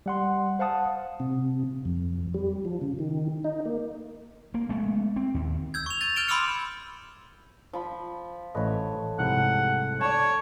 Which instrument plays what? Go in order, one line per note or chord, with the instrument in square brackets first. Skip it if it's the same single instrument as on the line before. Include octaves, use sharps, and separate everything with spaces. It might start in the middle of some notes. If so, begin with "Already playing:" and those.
[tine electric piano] G3 F#5 C6
C5 F5 F#5 A5 D#6
[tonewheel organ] C3
F2
G3
F3
C#3
D#3
D#4
A#3
[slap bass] A#3
G#3 A3 B3
C4
D#2
[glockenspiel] E6 G6 G#6
C#6 F7
G6 A6 D#7
F6 G6 A6 D7 E7 G7
B5 C6 D6 E6 F6 C#7
[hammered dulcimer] F3 B5
[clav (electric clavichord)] A1 B4 D#5 [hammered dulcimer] A3 C#5
[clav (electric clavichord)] C2 G#2 F3 [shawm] F#5
[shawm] C#5 [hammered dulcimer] D5 A5